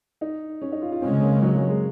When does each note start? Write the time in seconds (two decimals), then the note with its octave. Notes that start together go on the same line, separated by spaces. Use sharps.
0.21 D#4
0.61 C#4
0.72 D#4
0.82 F4
0.92 F4
1.02 C#3 G#3 C4 C#4
1.22 A#3
1.42 F#3
1.56 F#3
1.69 G#3